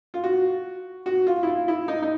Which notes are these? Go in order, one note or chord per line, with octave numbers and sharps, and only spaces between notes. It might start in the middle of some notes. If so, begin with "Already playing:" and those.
F4
F#4
F#4
F4
E4
F4
E4
D#4
D#4